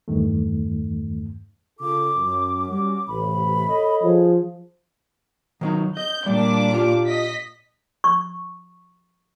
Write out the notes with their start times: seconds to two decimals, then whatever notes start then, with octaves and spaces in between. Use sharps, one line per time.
0.08 E2 G2 D#3 A3
1.80 C#3 F4 A4 D6
2.15 F#2
2.69 G3 C#4 F#4 D6
3.07 A1 C3 B5
3.68 A4 C#5 D#5
4.03 F3 G#4
5.61 D#3 F#3 D#4
5.97 D#5 G6
6.26 A#2 G3 D4 D6
6.74 F4 G4 F5
7.07 D#5 B6
8.04 C#6